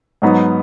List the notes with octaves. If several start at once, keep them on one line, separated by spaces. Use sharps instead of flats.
G#2 F#3 B3 D#4